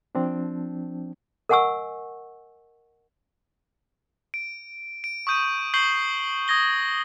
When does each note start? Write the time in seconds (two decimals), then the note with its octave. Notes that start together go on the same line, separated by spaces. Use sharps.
0.15 F3 C4 D4
1.49 A#4 D#5 F#5 G#5 C#6 E6
4.34 D7
5.04 D7
5.27 C#6 D#6 G6 D#7
5.74 C#6 G6 C7 F#7 G7
6.48 D#6 G#6 A#6 G7